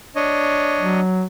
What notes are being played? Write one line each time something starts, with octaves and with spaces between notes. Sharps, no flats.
D4 C#5 D#5
F#3